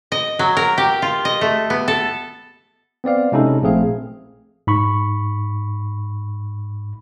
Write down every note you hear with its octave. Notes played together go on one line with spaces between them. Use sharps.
D#5
F#3
A#4
G4
F4
D#5
A3
B3
A4
B3 C4 D5 F5
C3 G#3 C#4 D#4 E4 A4
A#1 A3 C4 G#4 F5
G#2 B5 C#6